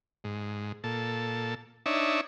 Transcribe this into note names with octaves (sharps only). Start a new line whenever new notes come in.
G#2
A#2 A4
D4 D#4 C#5 E5